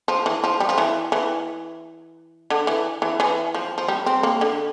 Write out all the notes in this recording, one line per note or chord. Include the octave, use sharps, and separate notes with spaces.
F3
E3
F3
G3
F3
E3
E3
D3
E3
E3
E3
F3
F3
G3
C4
A#3
D3